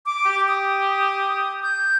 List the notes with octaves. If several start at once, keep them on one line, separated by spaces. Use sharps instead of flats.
D6
G4
D#6
G6